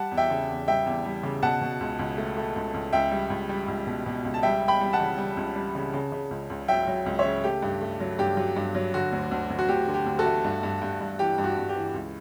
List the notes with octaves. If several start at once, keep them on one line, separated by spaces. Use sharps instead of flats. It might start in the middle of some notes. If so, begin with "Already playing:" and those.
Already playing: G3 F#5 A5
E2
E5 G5
C#3
E2
G3 E5 G5
E2
G3
C#3
B2 F#5 A5
B2
C#2
C#2
A3
A3
C#2
C#2
C#2 E5 G5
G3
C#2
G3
C#2
B2
B2
C#2
A5
G3 E5 G5
G3
G5 B5
G3
F#5 A5
C#3
G3
C#2
G3
C#3
C#3
C#3
C#2
C#2
F#3 E5 G5
F#3
C#2
C#5 E5
C#3
A3 G4
G2
A3
F#3
G2 G4
F#3
G2
F#3
D3 F#4
D2
D2
D2
F#4
D2 G4
D3
G4
D2
F#4 A4
A3
G2
G2
G2
G2
E3 G4
G2
F#4
G2
G4
E3
C#2